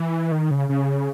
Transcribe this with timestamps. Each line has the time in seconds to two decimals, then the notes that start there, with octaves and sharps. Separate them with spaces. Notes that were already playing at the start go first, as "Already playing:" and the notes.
Already playing: E3
0.32 D#3
0.51 C#3
0.69 C#3